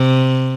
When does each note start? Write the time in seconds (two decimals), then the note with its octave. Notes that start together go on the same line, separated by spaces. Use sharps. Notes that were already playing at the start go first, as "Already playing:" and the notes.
Already playing: C3